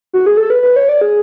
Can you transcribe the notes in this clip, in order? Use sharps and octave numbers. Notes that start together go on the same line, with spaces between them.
F#4
G#4
A4
B4
B4
C#5
D5
G#4